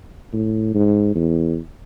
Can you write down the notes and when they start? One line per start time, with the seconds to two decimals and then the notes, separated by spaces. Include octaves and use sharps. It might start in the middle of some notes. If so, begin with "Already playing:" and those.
0.33 A2
0.75 G#2
1.15 E2